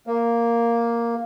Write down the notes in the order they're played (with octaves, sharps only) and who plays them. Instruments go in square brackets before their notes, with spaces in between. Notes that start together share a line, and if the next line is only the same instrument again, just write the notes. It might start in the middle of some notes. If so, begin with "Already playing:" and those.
[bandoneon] A#3